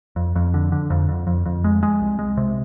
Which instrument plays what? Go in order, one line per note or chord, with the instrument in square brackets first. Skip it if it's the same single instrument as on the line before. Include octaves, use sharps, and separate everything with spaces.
[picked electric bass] F2
F2
D3
D3
F2
F2
F2
F2
G#3
G#3
C2
G#3
C3